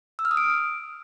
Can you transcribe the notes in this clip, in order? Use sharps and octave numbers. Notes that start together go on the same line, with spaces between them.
E6
F6
D#6
D7